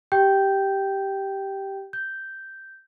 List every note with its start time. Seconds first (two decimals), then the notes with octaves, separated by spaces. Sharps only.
0.12 G4 G5 G6
1.93 G6